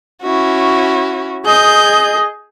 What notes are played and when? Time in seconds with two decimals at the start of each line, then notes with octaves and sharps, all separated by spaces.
0.22 C#4 E4 F#4
1.45 G#4 D#5 G6